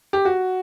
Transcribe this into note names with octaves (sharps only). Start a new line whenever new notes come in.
G4
F#4